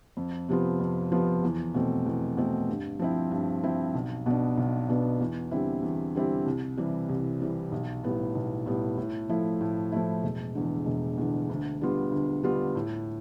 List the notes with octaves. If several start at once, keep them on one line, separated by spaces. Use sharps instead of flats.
F2
C3 F3 B3 F4
F2
C3 F3 B3 F4
E2
B2 A3 C4
E2
B2 A3 C4
G2
F3 C4 E4
G2
F3 C4 E4
B1
B2 B3 D4
B1
B2 B3 D4
E2
D3 G3 C4 E4
E2
D3 G3 C4 E4
C2
C3 E3 G3
C2
C3 E3 G3
B1
A2 G3 B3
B1
A2 G3 B3
A2
F3 A3 E4
A2
F3 A3 E4
E1
E2 D3
E1
E2 D3
D2
D3 G3 B3 F4
D2
D3 G3 B3 F4
A2